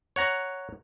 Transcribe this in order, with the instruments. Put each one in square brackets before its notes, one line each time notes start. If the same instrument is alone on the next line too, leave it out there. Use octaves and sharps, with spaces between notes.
[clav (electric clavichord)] C#5 F#5 A#5